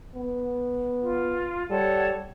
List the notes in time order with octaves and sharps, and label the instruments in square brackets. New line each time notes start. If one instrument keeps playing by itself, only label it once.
[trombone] B3
[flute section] F4
[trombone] G3 [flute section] A4 C#5 F#5